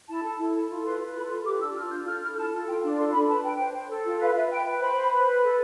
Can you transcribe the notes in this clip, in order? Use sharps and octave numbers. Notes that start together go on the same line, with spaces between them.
E4 A5
A4
E4
A4
F4
B4 C6
B4
A4 B5
F4 C6
G4 D6
D4 E6
F4 F6
D4 G6
A4 F6
E4 F6
A4 A5
F4
F4 G5
D4
A4 C6
D4 B5
B4 A5
B4 G5
C5
C5
A4
F4
B4 F5
B4 E5
B4 G5
B4
C5 B5
C5
B4
B4
A4